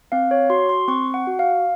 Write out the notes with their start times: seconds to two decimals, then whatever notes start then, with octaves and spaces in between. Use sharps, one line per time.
0.12 C4 F5
0.31 C#5
0.50 F#4 C6
0.69 C6
0.88 C4 C#6
1.14 F#5
1.27 F#4
1.39 F5